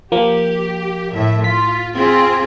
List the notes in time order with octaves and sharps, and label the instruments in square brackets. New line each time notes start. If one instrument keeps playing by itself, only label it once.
[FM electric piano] F3 A#3 [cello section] G4
[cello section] A2 E5
[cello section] F4 [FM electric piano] B6
[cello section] C4 F4 G#4